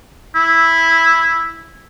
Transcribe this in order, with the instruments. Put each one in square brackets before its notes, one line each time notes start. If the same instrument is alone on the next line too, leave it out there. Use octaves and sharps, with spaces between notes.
[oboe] E4